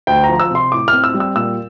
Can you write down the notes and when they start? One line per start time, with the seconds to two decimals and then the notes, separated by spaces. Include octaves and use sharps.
0.07 D2 G5
0.24 A#5
0.29 F3
0.40 E6
0.51 C3 C6
0.72 A2 D6
0.88 F6
0.93 C4
1.04 E6
1.14 G3
1.20 E6
1.36 A#2 E6